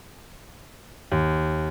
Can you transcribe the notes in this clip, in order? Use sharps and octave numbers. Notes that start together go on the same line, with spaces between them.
D#2